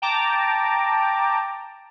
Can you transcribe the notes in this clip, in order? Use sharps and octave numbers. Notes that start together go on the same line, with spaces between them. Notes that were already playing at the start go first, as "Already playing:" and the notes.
G5 A5 A#5 D6